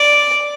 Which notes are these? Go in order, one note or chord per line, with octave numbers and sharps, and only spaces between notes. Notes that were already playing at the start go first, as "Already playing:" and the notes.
Already playing: D5